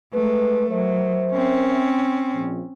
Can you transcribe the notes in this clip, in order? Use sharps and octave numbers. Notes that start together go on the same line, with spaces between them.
G#3 A3 B4
F#3 A#4 C5 E5
C4 C#4
A#1